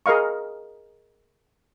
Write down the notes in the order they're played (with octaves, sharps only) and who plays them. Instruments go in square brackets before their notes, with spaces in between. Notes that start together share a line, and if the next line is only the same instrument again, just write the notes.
[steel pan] G#4 A#4 D#5 F5 C#6